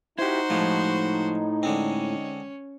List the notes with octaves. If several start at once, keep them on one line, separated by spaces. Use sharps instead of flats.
D#4 E4 F#4 G4 C5
A2 F3 G#3
D3 G#3 C4 C#4